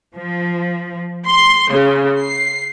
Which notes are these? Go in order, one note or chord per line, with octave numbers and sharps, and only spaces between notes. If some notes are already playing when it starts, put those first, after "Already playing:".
F3
C6
C#3
C7